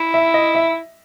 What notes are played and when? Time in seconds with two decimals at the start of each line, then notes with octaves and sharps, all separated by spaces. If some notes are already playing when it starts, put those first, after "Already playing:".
Already playing: E4
0.14 E5
0.34 D#5
0.55 E5